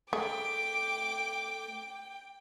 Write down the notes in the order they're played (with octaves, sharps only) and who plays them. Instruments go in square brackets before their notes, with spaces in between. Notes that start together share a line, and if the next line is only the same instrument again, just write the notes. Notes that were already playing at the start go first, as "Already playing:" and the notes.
[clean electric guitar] A3 [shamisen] G#4 [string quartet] G5 [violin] D6